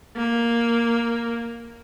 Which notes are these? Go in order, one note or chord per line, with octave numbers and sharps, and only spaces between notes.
A#3